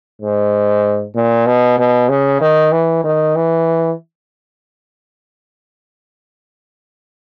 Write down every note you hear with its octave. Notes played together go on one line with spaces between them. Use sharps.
G#2
A#2
B2
B2
C#3
D#3
E3
D#3
E3